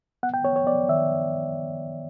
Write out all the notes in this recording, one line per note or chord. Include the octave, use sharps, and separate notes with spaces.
B3 F#5
G5
B3 C#5
C#5
B3 D5
D#3 E5